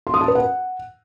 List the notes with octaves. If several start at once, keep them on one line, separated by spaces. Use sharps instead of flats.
C6
D#6
A5
B4
F#5